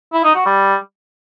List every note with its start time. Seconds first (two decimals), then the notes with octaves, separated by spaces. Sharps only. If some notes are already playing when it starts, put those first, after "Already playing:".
0.13 E4
0.24 D#4
0.35 F#4
0.46 G3